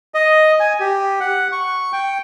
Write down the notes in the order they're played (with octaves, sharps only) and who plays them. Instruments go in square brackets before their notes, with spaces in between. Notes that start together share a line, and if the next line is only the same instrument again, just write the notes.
[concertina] D#5
G#5
G4
F#5
C#6
G5